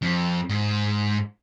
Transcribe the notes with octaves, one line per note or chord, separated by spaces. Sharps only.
F2
G#2